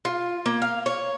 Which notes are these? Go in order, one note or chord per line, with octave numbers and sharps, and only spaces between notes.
F4
A#3
F5
C#5